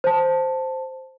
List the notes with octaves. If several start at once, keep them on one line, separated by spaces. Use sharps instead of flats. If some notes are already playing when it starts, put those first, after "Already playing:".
C5 A5